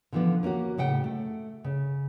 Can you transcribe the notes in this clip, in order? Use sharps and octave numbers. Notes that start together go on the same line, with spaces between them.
D3 E3 F3 B3 D4
A#3 C#4 F4 F#4
A2 C#3 F#5 G5
A3
C#3